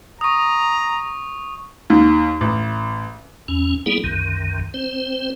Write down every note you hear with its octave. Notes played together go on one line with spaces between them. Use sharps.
A#5 C#6 D#6
D#2
A1
E2 C#4
G3 A#3 B3 E4 G#4
C2 F#2 D#3
C4 C5